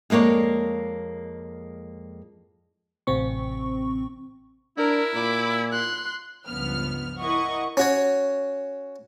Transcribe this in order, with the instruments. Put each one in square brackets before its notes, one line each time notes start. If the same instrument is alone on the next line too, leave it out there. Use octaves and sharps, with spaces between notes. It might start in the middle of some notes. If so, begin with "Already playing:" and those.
[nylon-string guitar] F2 G#3 A#3 C#5 D5
[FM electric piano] A1 C3 C4 C#6
[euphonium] D4 [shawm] E4 [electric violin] A#4
[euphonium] A#2 [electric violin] B5 D6
[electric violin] C6 F#6
[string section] C#2 G2 F3 B3 F6
E4 A#4 D#5 F#5 C#6
[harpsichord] C#4 F#4 C#5